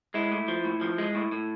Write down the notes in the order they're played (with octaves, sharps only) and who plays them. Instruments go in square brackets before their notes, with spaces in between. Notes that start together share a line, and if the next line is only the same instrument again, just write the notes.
[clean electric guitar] G#3 E4
A2
F3
A2
F3
G#3
A2
A2